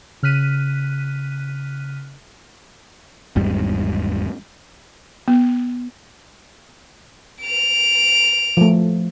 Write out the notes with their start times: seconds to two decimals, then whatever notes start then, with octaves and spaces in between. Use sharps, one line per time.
0.23 C#3 F6 F#6 B6 D#7
3.36 G#1 E2 G#2 G3
5.28 B3
7.42 D7 F7
8.57 F3 A3